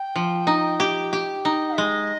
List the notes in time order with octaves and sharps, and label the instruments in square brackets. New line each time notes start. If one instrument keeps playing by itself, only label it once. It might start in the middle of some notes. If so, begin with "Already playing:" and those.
Already playing: [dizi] G5
[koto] F3
D#4
G4
G4
D#4
[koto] G#3 [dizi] D#5